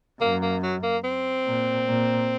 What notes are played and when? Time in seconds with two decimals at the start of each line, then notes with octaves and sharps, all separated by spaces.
0.21 F#2 A#3
0.42 A#3
0.63 F#3
0.83 A#3
1.04 C4
1.46 A#2
1.87 A#2